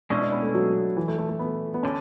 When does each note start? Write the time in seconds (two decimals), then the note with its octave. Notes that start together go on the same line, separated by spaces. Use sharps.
0.10 B2 G#3 C#4 D4 E4
0.22 D4
0.32 B3
0.42 A3
0.54 F#3
0.97 E3
1.08 A3
1.18 A3
1.29 A3
1.39 B3
1.74 B3
1.83 D3 C#4